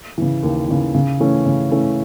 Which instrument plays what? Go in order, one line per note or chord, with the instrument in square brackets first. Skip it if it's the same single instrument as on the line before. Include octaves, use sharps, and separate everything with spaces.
[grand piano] C#3 E3
D#2
C#3 E3
C#3
E3 A3 C#4
C#3
E3 A3 C#4